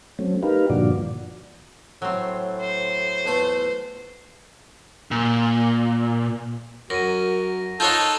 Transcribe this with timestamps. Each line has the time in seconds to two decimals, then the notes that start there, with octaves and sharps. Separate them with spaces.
0.19 F#3 A3 C4 C#4
0.43 D#4 G4 A#4 B4 F5
0.70 G2 A#2 D3 F3 F#4 D5
2.02 A2 F#3 C4
2.61 C5
3.25 E2 A3 F4
5.11 A#2
6.90 F#2 F#4 A#4 A#6 D#7
7.80 D#4 F4 A4 C#5 C6 F#6 G6